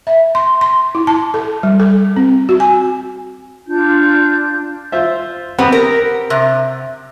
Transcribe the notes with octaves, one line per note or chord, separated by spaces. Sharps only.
E5
C6
C6
E4
A5
A4
G3
A4
C4
F#4
G#5
D4 F4 G6
F4 C5 E5
B3 C4 G4 F#5
A#4
C3